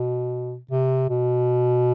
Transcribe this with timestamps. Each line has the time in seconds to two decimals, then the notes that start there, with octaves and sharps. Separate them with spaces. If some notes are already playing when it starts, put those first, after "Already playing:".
Already playing: B2
0.71 C3
1.09 B2